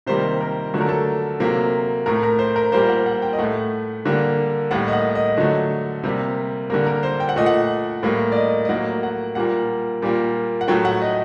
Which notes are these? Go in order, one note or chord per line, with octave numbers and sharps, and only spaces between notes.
C3 D#3 G3 A#3 C5
A#4
D3 F#3 A3 A4
A#4
A4
C3 F#3 A#3
A2 A3 A#4
A#4
C5
A#4
A#2 G3 A#3 C5
F#5
F#5
G5
D#5
A2 A3 F#5
D3 G3 A#3
A2 G3 A#3 F#5
D#5
F#5
D#5
D3 F#3 A3 D#5
C3 G3 A#3
D3 G3 A#3 A#4
A#4
C5
G5
F#5
A#2 A3 D#5
F#5
A2 G3 A#3
D5
D#5
D#5
A2 F#3 A#3 F#5
F#5
A#2 G3 A#3 F#5
A#2 G3 A#3
F#5
A2 F#3 A3 G5
F#5
D#5